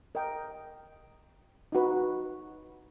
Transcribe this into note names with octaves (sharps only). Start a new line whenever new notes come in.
A#4 D#5 G5
D#4 F#4 B4